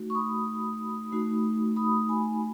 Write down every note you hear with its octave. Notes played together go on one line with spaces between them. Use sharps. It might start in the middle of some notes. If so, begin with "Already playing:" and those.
Already playing: A3 D#4 F#4
C#6
B5 D#6
A3 D#4 F#4
B5 D#6
G#5 B5